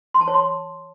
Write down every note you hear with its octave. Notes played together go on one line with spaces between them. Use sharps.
C6
A5
C#5
C6